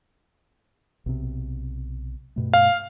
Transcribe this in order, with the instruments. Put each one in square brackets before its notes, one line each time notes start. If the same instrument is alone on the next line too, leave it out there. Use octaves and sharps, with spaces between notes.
[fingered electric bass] B1 C3
G2 B2 A3
[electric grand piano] F5